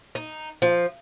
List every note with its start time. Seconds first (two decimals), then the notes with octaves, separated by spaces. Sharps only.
0.15 D#4
0.62 F3